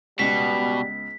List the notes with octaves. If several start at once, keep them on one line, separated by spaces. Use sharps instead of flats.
C#2 B2 G3 B3 B6